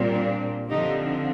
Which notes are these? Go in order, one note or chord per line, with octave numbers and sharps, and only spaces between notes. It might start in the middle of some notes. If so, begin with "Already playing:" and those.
Already playing: A#2 G3 C4
D4
D3 F3 C4 D#4 G4